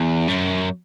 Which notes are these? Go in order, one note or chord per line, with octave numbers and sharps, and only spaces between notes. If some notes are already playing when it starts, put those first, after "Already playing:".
Already playing: E2
F#2